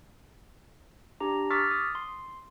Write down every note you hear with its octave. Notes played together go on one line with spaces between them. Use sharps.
D4 G4 A#5
C#6 D6 E6 F6 A6 B6
D#6
C6